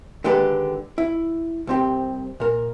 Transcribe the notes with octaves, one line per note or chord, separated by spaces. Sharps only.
D3 D#3 G#3 G4 A4 B4
E4
C2 C4 G4
A#2 A#4